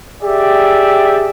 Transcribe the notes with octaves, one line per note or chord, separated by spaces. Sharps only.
G4 G#4 D5 E5